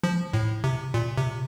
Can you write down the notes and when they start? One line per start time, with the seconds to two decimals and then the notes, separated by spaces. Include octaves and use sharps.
0.03 F3
0.34 A2
0.64 C3
0.94 A#2
1.18 C3